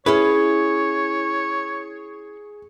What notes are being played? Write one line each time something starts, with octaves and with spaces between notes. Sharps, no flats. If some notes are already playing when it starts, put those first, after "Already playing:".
C#4 E4 G#4 B4 C#5